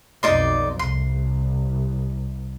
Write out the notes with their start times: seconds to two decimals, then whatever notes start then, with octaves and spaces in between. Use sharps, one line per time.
0.23 B1 F2 D#4 D5 C6
0.79 C2 C6